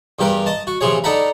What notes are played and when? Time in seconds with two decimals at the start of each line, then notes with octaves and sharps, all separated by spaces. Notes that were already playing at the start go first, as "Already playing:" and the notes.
0.19 E2 G2 G4 A#4 B4
0.46 D#5 A5
0.67 F#4
0.81 A#1 C3 E3 F3 G#4 C#5
1.04 D4 D#4 A4 F#5 A#5 B5